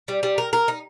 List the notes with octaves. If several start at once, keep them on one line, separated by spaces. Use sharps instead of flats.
G3
G3
A#4
A#4
D#4